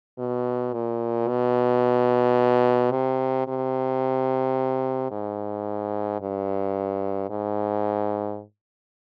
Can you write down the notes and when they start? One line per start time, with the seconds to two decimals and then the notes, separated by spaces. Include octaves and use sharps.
0.18 B2
0.73 A#2
1.28 B2
2.92 C3
3.48 C3
5.11 G#2
6.21 G2
7.30 G#2